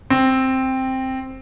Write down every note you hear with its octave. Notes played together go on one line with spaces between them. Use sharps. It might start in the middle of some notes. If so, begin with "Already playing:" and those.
C4